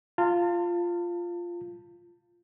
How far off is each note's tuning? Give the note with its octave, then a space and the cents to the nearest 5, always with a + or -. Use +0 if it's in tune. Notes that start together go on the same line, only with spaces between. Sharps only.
F4 -5 A5 +35